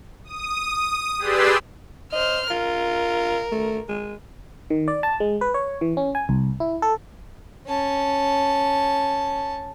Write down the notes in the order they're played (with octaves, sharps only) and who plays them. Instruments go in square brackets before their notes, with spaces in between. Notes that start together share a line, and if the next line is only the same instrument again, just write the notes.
[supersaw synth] D#6
G4 G#4 B4 D5 C6 E6
[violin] C5 F6 [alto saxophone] D#5
[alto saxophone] F4 [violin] A#4
[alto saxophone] A3
G#3
[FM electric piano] D#3
D5
A5
G#3
B4
C#5
E3
C#4
G#5
C2
E4
A4
[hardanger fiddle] C#4 A5